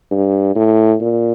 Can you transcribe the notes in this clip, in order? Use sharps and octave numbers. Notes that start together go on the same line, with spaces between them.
G2
A2
A#2